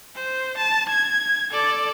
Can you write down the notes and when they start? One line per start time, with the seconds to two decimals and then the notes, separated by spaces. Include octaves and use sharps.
0.15 C5
0.57 A5
0.89 G#6
1.51 A4 D5